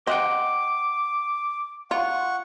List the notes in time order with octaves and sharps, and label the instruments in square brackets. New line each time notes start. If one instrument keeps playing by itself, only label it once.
[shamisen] C4 [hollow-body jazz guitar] D#5 F#5 G5 [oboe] D6
[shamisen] F4 [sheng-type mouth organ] F#5 C#6